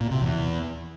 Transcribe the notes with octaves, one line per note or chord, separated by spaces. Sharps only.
A#2
C3
E2